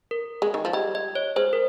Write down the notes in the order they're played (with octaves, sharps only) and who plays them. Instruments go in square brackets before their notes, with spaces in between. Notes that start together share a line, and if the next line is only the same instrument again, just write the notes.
[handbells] A#4
[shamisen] G#3
D#3
F3
[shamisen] G3 [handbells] D#5
[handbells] D#5
C#5
[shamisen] G#3 [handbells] C5
[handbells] A#4